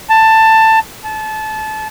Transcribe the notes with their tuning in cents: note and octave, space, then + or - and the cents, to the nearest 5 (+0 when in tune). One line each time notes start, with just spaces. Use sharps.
A5 +15
A5 -25